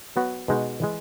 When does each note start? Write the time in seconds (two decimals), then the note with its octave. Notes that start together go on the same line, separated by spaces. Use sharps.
0.16 F#3 B3 F#4
0.48 B2 G#3 D#4 F#4
0.82 E3 G#3